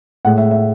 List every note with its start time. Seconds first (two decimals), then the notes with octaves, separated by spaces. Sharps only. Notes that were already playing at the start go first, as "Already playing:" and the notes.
0.25 A2 G#3 F#5
0.38 E5
0.51 E5